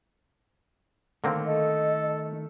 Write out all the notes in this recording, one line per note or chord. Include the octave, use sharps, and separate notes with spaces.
D3 D#3 A3 A#3 C4
A4 D#5